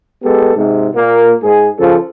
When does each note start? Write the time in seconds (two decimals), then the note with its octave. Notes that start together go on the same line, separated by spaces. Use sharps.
0.23 G#3 B3 G4 A4
0.56 G#2 C3
0.95 A#2 A#3
1.43 G#2 G#4
1.78 C#3 F3 A4